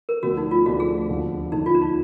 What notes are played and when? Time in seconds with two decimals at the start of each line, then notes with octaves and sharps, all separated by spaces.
0.09 A#4
0.22 D2 D3 F3 B3 D4 F#4
0.37 D#4
0.51 F4
0.66 D2 D3 F3 B3 D4 F#4
0.80 G#4
1.09 D#2 D3 F3
1.52 D#2 D3 F3 D#4
1.66 F4
1.75 D4
1.81 D#4